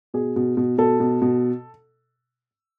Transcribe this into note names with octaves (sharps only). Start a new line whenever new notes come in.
B2 G#4
B2
B2
B2 A4
B2
B2